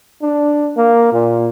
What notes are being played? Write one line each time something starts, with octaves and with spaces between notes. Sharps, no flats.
D4
A#3
A#2